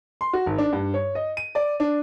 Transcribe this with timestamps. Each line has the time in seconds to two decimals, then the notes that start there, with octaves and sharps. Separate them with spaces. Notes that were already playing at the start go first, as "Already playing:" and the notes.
0.21 C6
0.33 F#4
0.46 G#1
0.58 D4
0.73 G2
0.94 C#5
1.15 D#5
1.37 D#7
1.55 D5
1.80 D4